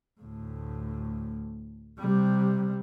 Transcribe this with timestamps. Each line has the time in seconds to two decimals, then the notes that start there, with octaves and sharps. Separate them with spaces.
0.21 D2 A2
1.99 C3 G3